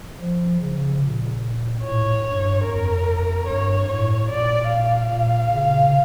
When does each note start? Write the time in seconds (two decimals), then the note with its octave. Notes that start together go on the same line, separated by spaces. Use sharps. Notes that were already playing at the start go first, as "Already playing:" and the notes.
0.20 F3
0.60 C#3
1.02 A#2
1.83 A2 C#5
2.25 G2
2.65 F2 A#4
3.47 G2 C#5
3.88 A2 C#5
4.29 A#2 D5
4.70 F5
5.11 A#2
5.52 C#3